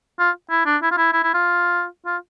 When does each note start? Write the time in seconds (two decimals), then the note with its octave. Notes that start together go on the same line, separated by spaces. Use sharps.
0.19 F4
0.50 E4
0.66 D4
0.82 E4
0.91 F4
0.97 E4
1.13 E4
1.23 E4
1.34 F4
2.06 F4